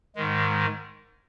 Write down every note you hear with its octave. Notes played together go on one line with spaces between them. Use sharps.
G#2 D#3 G#3